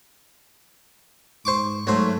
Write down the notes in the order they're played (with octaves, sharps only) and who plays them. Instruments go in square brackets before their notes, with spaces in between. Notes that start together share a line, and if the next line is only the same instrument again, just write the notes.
[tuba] G#2 [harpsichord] C5 C#6 D6
[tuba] G#2 [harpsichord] F#3 C5 [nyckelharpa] A3